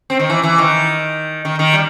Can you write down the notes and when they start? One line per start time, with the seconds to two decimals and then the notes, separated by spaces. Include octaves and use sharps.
0.10 C4
0.19 D#3
0.30 E3
0.43 E3
0.58 D#3
1.45 D#3
1.59 D#3
1.73 G3